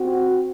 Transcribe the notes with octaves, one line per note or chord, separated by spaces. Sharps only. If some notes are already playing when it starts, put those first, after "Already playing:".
Already playing: C4 F#4